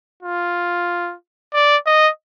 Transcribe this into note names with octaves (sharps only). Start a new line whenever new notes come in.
F4
D5
D#5